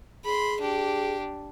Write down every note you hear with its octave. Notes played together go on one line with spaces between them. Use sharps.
G#4 B5 C6
D4 G4